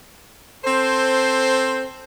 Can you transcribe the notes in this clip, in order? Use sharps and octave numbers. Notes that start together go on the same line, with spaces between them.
C4 A4 C5